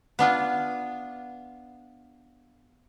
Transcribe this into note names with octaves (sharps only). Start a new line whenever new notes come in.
B3 D4 F4